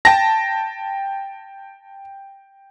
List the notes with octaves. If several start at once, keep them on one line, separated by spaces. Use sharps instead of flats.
G5 A5 A#6